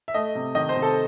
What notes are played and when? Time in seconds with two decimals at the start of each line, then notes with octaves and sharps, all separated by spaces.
0.08 E5
0.14 A3 D#5
0.35 C3
0.55 D#3 D#5
0.69 C5
0.76 C3
0.82 A4